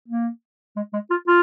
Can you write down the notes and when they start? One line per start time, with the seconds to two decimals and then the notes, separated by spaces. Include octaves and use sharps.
0.08 A#3
0.76 G#3
0.93 G#3
1.10 F4
1.28 F4